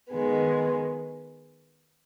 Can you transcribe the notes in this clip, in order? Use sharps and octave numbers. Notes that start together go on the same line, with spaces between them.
D#3 G#3 B3